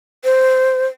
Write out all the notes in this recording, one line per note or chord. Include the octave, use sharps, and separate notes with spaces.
C5